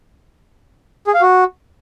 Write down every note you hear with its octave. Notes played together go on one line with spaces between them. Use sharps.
G#4
F5
F#4